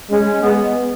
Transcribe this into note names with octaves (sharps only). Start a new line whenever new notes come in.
G#3 C#4
G#3 B3